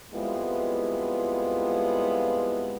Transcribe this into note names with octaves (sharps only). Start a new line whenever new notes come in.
F2 G3 G#3 B3 E4 F4